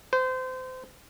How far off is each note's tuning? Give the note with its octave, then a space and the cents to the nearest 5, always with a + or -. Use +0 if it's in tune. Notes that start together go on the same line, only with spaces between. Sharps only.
C5 -30